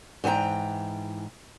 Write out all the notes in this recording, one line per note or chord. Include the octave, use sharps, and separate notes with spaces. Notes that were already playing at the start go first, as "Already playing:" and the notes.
G#2 E3 C5 G5 A#5